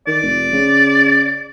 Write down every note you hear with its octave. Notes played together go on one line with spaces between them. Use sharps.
D#3 D5
F1
C#3